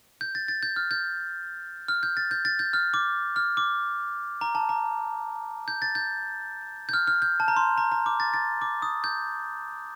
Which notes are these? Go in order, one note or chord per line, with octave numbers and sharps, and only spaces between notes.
G6
A6
A6
G6
F6
G6
F6
G6
A6
G6
A6
G6
F6
D6
F6
D6
A#5
A5
A#5
G6
A6
G6
G6
F6
F6
G6
A5
A#5
C6
A#5
A#5
D6
A6
A6
D6
D#6
G6